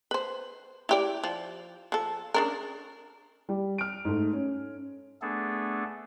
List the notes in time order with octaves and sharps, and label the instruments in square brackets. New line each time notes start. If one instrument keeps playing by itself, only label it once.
[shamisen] B4 C5
E4 G4 D5
F3
F3 A4
C#3 D4 A#4
[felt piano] G3
F6 D7
G#2 A3
C#4
[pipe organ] A3 B3 D4 G#4 A4